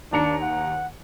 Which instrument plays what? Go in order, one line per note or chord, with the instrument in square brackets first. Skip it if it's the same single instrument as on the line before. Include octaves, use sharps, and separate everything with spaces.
[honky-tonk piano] D#2 A#5 C#7 [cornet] D4
[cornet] F#5